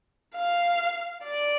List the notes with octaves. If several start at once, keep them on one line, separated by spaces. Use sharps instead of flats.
F5
D5